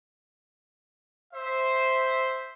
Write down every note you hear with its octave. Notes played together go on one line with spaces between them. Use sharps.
C5 E5